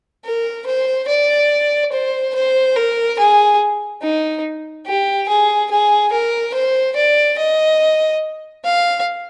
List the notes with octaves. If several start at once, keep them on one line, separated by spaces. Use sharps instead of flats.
A#4
C5
D5
C5
C5
A#4
G#4
D#4
G4
G#4
G#4
A#4
C5
D5
D#5
F5